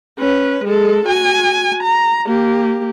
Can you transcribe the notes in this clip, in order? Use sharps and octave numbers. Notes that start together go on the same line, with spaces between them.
C#4 B4
G#3 A4
F#4 G#5
A#5
A#3 G4